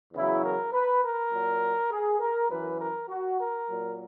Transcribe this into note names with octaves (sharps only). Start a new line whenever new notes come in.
E2 C#3 F#3 E4
A#4
B4
A#4
A#2 F#3
G#4
A#4
F#2 E3 B4
A#4
F#4
A#4
A#2 F#3